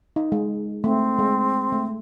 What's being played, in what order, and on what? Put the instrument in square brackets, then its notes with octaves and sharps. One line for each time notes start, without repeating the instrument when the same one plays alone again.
[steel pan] D#4
G#3
[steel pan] A3 [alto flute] C4
[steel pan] G#3
A3